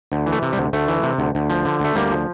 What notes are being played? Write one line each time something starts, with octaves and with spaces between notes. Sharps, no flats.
D2
E3
A3
C3
G3
D2
D2 A3
E3
C3
D2
D2
F3
D3
D2 A3
D2 G3 A#3
F3